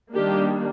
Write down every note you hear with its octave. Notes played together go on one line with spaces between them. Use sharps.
D#3 G3 A#3 D4 G4